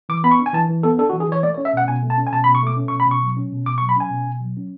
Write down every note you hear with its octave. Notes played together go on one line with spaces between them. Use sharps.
E3 D6
B3 B5
C#6
D4
G#5
E3 A5
E3
B3 A4
D4 A4
F#4
E3
G#4
E3 C#5
A3 D5
C#5
C#4
E5
B2 F#5
B2 G#5
A3
A5
C#4
G#5
B2 A5
B5
B2
C#6
A3 D6
C#4
C#6
B2
B5
B2 C#6
F#3
C#4
B2
B2 D6
C#6
F#3
B5
C#4 G#5
B2
B2
F#3
C#4